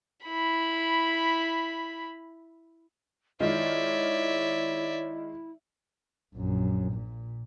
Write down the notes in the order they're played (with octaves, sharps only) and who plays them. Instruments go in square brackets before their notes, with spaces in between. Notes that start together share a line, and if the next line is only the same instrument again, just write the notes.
[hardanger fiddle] E4 B5
[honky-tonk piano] D#3 G#3 F4 [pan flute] E4 [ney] C#5 [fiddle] D5 E5
[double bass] A#1 F#2
A#2